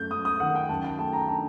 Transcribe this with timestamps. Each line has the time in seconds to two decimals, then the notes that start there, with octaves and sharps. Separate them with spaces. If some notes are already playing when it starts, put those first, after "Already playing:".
Already playing: F#2 A3 G6
0.11 F#2 D#6
0.25 D#6
0.40 D#3 F#5
0.55 G5
0.69 F#2 A5
0.84 G5
0.99 A3 A5
1.13 A#5
1.28 D4 A5